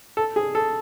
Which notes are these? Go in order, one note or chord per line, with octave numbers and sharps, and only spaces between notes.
A4
G#4
A4